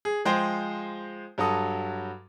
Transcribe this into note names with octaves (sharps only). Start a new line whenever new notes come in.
G#4
F3 G#3 G#4 C5 G5
G2 F#3 F#4 A4 D#6